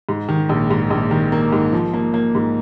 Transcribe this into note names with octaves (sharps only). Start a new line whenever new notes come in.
G#2
D#3
A#1
G#2
A#1
D#3
A#3
G#2
F3
A#3
A#3
G#2